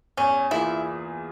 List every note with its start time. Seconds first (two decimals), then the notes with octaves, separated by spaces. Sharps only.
0.17 E2 C#4
0.51 E3 A#3 E4 F4 G#4